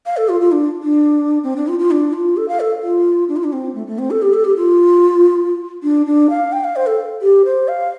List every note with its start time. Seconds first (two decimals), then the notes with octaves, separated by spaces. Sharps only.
0.06 F5
0.17 A4
0.29 F4
0.41 F4
0.52 D4
0.83 D4
1.44 C4
1.56 D4
1.68 F4
1.79 F4
1.91 D4
2.13 F4
2.37 A4
2.48 F5
2.60 A4
2.83 F4
3.29 D4
3.37 F4
3.44 D4
3.53 C4
3.75 A3
3.87 A3
3.99 C4
4.11 A4
4.22 G4
4.33 A4
4.45 G4
4.57 F4
5.83 D4
6.06 D4
6.30 F5
6.53 G5
6.64 F5
6.76 C5
6.87 A4
7.22 G4
7.45 C5
7.68 F5